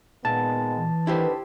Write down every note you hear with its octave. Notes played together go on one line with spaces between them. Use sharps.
A#2 D#3 G#3 B3 A5
E3
D3 D#3 E4 G4 B4 C5